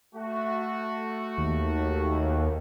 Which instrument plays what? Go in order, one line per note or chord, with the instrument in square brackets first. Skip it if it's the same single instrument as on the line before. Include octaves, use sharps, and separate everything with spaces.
[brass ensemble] A3 F#4
[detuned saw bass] D#2